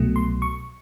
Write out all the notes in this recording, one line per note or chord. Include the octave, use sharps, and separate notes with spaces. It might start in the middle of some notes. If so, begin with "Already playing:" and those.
Already playing: C2 B2 F#3 A3
C6
C#6